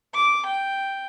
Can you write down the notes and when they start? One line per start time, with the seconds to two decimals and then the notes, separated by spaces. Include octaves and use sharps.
0.14 D6
0.47 G5